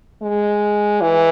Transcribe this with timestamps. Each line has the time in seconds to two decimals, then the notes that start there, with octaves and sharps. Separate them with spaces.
0.22 G#3
1.01 E3